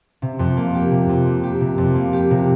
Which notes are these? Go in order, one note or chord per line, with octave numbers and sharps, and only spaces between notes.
C3
F2
A#3
G4
C3
F2
A#3
G4
C3
F2
A#3
G4
C3